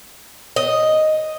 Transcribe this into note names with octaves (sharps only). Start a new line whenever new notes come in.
D#5